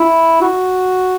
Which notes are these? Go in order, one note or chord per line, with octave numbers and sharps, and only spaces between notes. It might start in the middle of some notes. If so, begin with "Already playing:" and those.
Already playing: E4
F#4